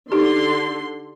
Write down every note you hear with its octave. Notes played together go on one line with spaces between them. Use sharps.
D3 D#4 G4 C6